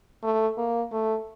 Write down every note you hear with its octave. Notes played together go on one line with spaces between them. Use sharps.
A3
A#3
A3